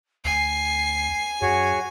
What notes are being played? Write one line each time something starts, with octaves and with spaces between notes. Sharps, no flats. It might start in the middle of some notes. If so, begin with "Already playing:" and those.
D2 G#5 C7
F#2 F#4 G#4 C#5